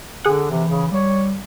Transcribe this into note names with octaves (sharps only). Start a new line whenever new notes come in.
D3 G#4 F#5
C3 E3
C#3
G3 C#5